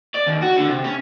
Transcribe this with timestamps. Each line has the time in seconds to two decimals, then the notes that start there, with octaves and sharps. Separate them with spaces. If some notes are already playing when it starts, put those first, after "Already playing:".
0.15 D5
0.27 D#2
0.42 F#4
0.57 D3
0.69 C3
0.84 C#4